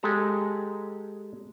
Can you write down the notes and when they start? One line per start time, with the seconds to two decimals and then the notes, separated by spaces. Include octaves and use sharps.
0.03 G#3 G4 A4 A5 A#5